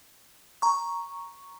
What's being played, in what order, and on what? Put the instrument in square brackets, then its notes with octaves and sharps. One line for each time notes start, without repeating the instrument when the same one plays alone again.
[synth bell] A#5 C#6